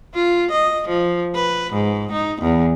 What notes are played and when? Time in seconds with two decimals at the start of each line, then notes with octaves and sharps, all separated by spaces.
0.15 F4
0.52 D#5
0.89 F3
1.35 B4
1.74 G#2
2.12 D#4
2.43 E2